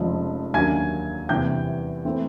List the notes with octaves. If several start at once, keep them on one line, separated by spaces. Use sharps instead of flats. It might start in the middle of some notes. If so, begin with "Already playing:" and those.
Already playing: F1 F2 C#3 F3 G#3
D#2 D3 F#3 A#3 C#4 G#5 G#6
E2 C3 E3 G3 C4 G5 G6
E3 A3 C4